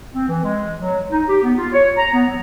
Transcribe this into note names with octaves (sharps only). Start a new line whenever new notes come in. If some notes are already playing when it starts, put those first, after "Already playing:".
C4
E3
G#3
F#3
D#4
G4
B3
F4
C#5
A#5
B3
F#3